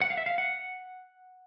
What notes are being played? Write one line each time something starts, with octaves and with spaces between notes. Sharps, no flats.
F#5
F5
E5
F5
F#5